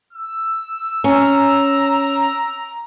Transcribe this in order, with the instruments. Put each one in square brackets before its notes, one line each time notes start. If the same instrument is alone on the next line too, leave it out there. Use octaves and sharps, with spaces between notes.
[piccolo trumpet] E6
[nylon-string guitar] C#4 [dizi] A#5